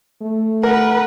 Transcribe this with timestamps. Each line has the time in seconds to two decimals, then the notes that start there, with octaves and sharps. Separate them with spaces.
0.22 A3
0.63 A#4 B4 F#5